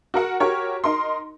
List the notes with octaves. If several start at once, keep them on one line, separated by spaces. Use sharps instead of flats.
F#4 A#4 F#5
F#4 G4 A#4 C#5
D#4 A#4 C6